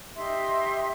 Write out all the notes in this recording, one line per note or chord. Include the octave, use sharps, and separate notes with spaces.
D#4 G4 E5 C6